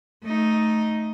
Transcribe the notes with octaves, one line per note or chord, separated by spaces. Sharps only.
A3 D#4